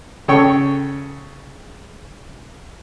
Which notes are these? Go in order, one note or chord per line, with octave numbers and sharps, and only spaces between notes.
C#3 A4 C#5 G5 C#6